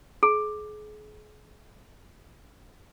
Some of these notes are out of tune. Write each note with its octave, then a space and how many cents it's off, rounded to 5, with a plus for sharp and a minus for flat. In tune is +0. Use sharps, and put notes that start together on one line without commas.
G#4 +35